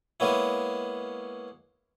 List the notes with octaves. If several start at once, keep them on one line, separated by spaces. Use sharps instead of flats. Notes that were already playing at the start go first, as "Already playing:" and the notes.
G#3 A#3 B3 C#4 E4